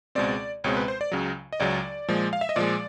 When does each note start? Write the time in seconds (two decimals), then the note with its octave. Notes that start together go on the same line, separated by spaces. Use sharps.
0.15 C#2 B2 G#3 C4 D5
0.64 C#2 B2 G#3 C4 C#5
0.77 B4
0.88 C5
1.01 D5
1.12 C#2 C#3 F#3
1.53 D#5
1.60 C#2 C#3 F#3 D5
2.08 A#2 F3 G#3
2.33 F5
2.41 E5
2.49 D#5
2.56 A#2 F3 G#3 D5